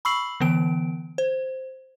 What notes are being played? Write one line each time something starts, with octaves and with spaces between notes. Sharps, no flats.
B5 C#6 E6 C7 F#7
D3 E3 B3 D7
C5